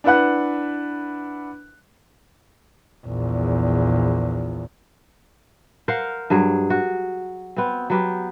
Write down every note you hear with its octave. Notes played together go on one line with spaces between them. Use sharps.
D4 E4 B4 F#5 F#6
A#1 E2
A#4 C5 F5 F#5
G2 F#3 G#4
F#4
B3 C4
F#3 B3 G4